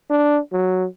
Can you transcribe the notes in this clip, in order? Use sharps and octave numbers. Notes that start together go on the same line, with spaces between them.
D4
F#3